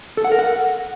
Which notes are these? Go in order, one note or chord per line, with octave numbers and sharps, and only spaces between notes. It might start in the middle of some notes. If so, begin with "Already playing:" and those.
A4
F#5
A#4
F#5